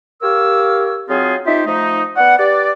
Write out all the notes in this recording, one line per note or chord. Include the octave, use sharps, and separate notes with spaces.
G4 A#4 C#5 F5 E6
F#3 C4 D#4 F4 G#4
D#4 F4 G4 C5 E5
F3 A3 D#4
B3 D5 F#5
G4 B4 D5